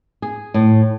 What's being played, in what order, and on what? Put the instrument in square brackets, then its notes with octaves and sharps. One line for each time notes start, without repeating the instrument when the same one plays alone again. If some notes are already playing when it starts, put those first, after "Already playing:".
[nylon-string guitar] G#4
A2